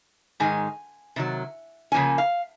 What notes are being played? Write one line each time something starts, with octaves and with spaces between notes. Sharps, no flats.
G#2 D#3 G#3 G#5
C3 D#3 F#3
C#3 F3 A#3 C#4 G#5
F5